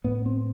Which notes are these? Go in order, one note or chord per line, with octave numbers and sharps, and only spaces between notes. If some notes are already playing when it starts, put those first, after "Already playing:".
A2 B3
C4